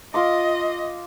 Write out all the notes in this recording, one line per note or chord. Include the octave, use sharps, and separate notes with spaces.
F4 D#5 C6 D6